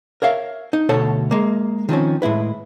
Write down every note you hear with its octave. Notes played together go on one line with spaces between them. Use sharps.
A#4 C#5 E5 F5
D#4
D2 B2 A4 C#5 A5
G#3 A#3
D#3 F3 C4 C#4
A2 G#3 E4 B4